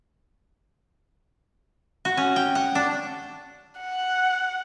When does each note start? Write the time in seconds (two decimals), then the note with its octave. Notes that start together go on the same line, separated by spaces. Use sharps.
2.05 F#4
2.17 C#4
2.36 G5
2.55 F#5
2.75 D4
3.80 F#5